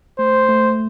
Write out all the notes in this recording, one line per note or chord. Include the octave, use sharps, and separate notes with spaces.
A3 C5
A3